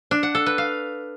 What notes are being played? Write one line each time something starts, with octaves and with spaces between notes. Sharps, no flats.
D4
F#5
A4
B4
F5